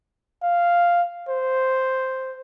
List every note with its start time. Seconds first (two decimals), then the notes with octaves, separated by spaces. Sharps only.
0.43 F5
1.29 C5